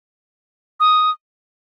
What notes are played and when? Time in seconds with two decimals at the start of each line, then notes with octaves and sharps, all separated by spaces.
0.80 D#6